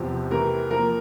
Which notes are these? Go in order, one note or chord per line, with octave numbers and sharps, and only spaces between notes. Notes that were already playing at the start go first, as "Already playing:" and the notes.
Already playing: E2 C3 F3 C4 G4
C3 E3 A3 A#4
F3 A#3 F4 A#4